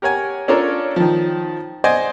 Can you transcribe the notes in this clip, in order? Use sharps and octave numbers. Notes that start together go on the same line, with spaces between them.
G4 A#4 C#5 F#5 G#5
C#4 D4 F4 A4 A#4 C#5
D#3 F3
C5 D5 D#5 F#5 G#5